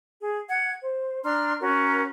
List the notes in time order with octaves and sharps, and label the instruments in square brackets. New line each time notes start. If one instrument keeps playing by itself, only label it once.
[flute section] G#4
F#5 G#6
C5
D4 A#5 C6 F6
C#4 F#4 A#4